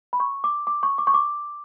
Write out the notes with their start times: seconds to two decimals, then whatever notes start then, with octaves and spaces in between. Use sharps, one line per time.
0.13 B5
0.20 C#6
0.44 D6
0.67 D6
0.83 C#6
0.98 D6
1.07 C#6
1.14 D6